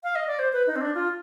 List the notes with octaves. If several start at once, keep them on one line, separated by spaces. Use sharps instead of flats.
F5
D#5
D5
C5
B4
D#4
C4
D4
F4